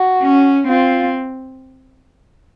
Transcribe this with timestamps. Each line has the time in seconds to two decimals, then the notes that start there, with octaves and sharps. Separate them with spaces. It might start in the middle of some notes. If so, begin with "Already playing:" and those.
Already playing: F#4
0.22 C#4
0.67 C4 F4